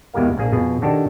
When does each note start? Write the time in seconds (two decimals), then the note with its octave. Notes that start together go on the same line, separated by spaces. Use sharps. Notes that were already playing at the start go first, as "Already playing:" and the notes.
0.14 E2 B2 G#3 G4 A#4 F5
0.38 A#1 A#3 G#4
0.52 F2 B2 G#4
0.82 D#3 D4 F#4 G4 A4 C#5